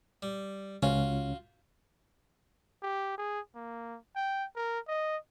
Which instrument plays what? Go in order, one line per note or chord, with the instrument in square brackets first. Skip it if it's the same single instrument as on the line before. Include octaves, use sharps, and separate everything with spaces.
[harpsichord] G3
[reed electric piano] C#2 C#4 [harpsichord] F4 F#4
[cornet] G4
G#4
A#3
G5
A#4
D#5